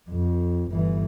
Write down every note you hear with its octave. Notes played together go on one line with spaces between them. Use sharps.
F2
G1 E3